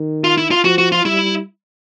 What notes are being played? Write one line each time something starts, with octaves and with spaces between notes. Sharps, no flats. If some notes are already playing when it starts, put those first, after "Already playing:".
Already playing: D#3
F4
E4
F4
F3 F#4
F#4
F4
G3 E4